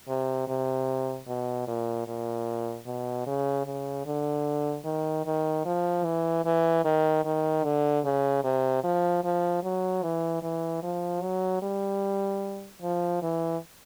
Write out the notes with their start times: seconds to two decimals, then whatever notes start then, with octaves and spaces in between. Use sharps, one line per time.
0.08 C3
0.48 C3
1.27 B2
1.67 A#2
2.07 A#2
2.86 B2
3.26 C#3
3.66 C#3
4.06 D3
4.85 D#3
5.26 D#3
5.65 F3
6.04 E3
6.45 E3
6.85 D#3
7.25 D#3
7.64 D3
8.04 C#3
8.44 C3
8.84 F3
9.24 F3
9.63 F#3
10.03 E3
10.42 E3
10.83 F3
11.22 F#3
11.62 G3
12.82 F3
13.22 E3